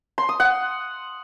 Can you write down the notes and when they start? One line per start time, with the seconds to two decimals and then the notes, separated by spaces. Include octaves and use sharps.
0.18 C6
0.29 D#6
0.40 F#5